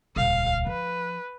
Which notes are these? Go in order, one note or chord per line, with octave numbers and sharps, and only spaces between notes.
D#1 C#2 F5
F3 B4